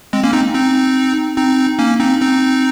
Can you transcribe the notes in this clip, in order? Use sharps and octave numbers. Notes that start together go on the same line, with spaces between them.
G#3 C4
A#3 C#4
C4 D#4
C4 D#4
C4 D#4
A#3 C#4
C4 D#4
C4 D#4